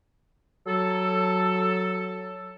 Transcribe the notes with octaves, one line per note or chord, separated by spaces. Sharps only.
F#3 A4